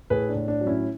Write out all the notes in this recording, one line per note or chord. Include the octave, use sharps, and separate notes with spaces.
A2 G#4 B4
D4
A2
D4
F#3
C#4 E4